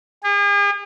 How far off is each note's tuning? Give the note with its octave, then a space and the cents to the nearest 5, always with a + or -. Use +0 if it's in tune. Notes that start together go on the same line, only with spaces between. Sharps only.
G#4 -45